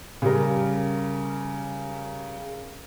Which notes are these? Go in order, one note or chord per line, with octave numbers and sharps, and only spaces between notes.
C#3 G3 A#4